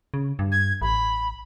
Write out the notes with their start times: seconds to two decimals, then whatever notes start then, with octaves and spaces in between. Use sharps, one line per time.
0.14 C#3
0.39 G2
0.52 G#6
0.82 A1 B5